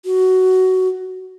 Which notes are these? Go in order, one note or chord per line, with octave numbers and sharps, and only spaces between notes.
F#4